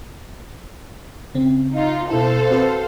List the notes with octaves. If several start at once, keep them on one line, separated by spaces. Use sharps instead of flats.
C#3 C4
D#4 F4
B2 E4 A4 C5 F5
C4 F#4 B4